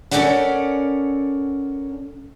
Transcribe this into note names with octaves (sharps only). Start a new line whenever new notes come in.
C#4 D4 A4 A#4 D5 F#5